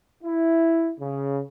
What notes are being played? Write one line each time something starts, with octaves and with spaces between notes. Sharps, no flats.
E4
C#3